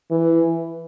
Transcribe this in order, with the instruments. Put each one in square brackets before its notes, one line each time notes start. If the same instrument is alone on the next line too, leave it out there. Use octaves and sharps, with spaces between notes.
[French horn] E3